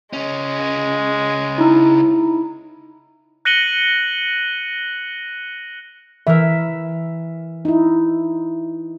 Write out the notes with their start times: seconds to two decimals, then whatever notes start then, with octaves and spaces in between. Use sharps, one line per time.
0.13 C#2 G#3 C#4
1.58 D#4 E4
3.45 F#6 A#6 C#7 D#7 F#7 G7
6.27 E3 A#4 E5
7.65 D#4 E4